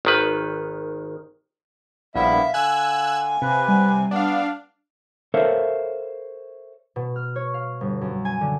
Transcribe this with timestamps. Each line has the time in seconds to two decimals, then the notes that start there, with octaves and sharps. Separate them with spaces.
0.05 G#1 D#3 B4
2.15 A#1 G3 B3 E4 E5 F5
2.54 D3 G#5 E6 F#6 G#6
3.42 C3 B4
3.68 G3 F#5
4.11 B3 D4 F5
5.34 A4 A#4 C5 C#5 E5 F5
6.96 B2
7.16 F6
7.36 C#5
7.54 F5
7.81 G1
8.01 F#2
8.25 G#5
8.41 D3